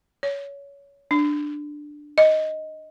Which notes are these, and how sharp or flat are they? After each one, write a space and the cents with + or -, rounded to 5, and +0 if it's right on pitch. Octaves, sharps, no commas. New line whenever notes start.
C#5 +20
D4 +10
D#5 +10